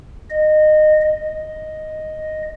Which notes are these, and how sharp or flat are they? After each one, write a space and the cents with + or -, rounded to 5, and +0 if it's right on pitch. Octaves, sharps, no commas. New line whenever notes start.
D#5 -20
D#5 +0